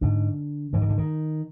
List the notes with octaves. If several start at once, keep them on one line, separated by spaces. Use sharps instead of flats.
G#2 D3
G#2 E3
D#3
D3
D#3